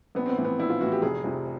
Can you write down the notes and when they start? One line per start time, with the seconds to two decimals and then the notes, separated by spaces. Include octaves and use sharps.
0.15 A#1 B3
0.26 C4
0.29 B3
0.37 A2 E3
0.45 B3
0.59 A#1 E4
0.70 F4
0.81 A2 E3 F#4
0.92 G4
1.02 F1 G#4
1.24 F2 C3 F3